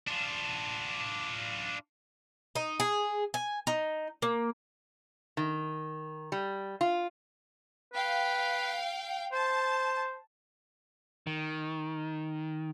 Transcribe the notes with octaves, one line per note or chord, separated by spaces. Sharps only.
D4 F4
D#4
G#4
G#5
D#4
A#3
D#3
G3
F4
B4 F5 G5
C5 A5
D#3